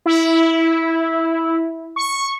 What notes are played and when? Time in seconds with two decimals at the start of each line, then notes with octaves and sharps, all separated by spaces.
0.06 E4
1.96 C#6